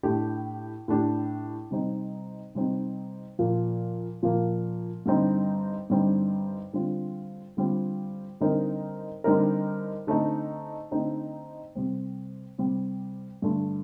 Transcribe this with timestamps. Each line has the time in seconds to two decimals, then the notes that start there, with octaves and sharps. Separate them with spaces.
0.03 A2 A3 D4 G4
0.88 A2 A3 D4 G4
1.71 C3 G3 C4 D#4
2.55 C3 G3 C4 D#4
3.39 A#2 F3 A#3
4.22 A#2 F3 A#3
5.06 G2 D3 G3 C4 D#4
5.90 G2 D3 G3 C4 D#4
6.73 D3 G3 C4 F4
7.57 D3 G3 C4 F4
8.40 D3 G3 C4 D#4 A#4
9.24 D3 G3 C4 D#4 A#4
10.07 D3 A3 C4 D#4
10.91 D3 A3 C4 D#4
11.75 C3 G3 C4
12.59 C3 G3 C4
13.42 G2 D3 A3